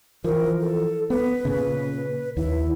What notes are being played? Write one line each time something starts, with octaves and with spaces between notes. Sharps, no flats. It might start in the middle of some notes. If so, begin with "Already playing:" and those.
E3 F3 A#4
A4
B3 B4
A#2 C#3
D#2 E4